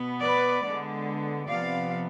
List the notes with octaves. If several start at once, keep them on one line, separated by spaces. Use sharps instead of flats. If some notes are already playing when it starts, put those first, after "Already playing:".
Already playing: B2 B3
B4 D5
D3 G#3 B3
C3 F3 B3 D5 F5